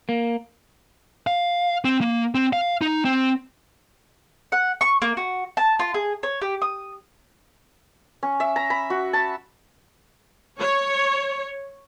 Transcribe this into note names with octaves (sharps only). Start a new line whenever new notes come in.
A#3
F5
C4
A#3
C4
F5
D#4
C4
F#5
C#6
A#3
F#4
A5
F4
G#4
C#5
G4
D#6
C#4
E5
A#5
B5
F#4
A5
C#5